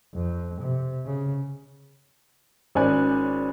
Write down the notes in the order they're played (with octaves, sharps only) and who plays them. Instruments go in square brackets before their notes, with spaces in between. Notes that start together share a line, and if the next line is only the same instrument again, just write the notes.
[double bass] F2
C3
C#3
[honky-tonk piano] G#1 C#4 C5 D5 G#5 F#6